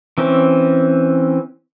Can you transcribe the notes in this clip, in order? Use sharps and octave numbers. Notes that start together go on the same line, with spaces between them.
E3 C4 C#4